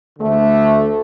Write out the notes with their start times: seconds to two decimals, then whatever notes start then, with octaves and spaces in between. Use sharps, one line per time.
0.19 D2 D3 A3